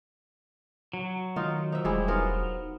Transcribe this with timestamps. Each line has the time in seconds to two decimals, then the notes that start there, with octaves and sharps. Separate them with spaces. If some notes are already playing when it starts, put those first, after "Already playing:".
0.94 F#3
1.36 D#3 D#4 F4
1.72 D#4 F4 C5 E5
1.85 E1 G3 G#3 E4 C5
2.08 B3 D#4 F4 A#4 C5